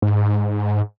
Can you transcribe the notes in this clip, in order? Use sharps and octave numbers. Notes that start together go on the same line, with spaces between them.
G#2